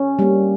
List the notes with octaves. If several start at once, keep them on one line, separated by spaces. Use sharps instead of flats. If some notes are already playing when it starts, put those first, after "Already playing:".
Already playing: C#4
G3 A#3